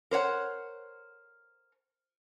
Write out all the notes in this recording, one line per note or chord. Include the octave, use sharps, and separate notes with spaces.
A#4 C5 C#5 F#5